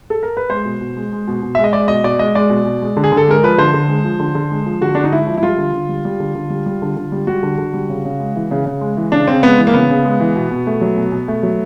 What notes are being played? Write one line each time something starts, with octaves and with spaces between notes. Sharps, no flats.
A4
A#4
B4
G#3 C5
B2
B2
G#3
G#3
B2
B2
G#3 E5
D#5
G#3 D5
B2 D#5
B2 D5
G#3 D#5
G#3 D5
B2
B2
G#3
D3
G#4
D3
A4
G#3 A#4
F3 B4
D3 C5
D3
G#3
F3
D3
D3
G#3
F3
D3 F#4
D3 D4
D#4
G#3 E4
F3
E4
G3 F4
D3
D3
G3
G3
D3
D3
G3
G3
D3
D3
G3
G3 F#4
D3
D3
G3
C#3
C#3
G#3
E3
C#3
C#3
G#3
E3
C#3 D4
C#3 C4
G#3 B3
E3
A#3
C#3 B3
C#3
G#3
E3
B2
B2
A3
F#3
B2
B2
A3
F#3